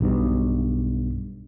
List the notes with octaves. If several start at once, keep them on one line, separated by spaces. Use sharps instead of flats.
B1 G2 B2